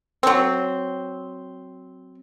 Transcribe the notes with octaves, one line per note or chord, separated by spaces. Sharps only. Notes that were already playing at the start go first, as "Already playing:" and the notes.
F#3 C4